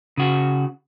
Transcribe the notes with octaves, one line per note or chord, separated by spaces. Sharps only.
C#3 F#4